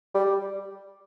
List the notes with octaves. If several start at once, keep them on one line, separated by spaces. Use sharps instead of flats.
G3